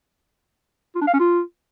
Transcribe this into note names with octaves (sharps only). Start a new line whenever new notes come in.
F4
D4
F5
C#4
F4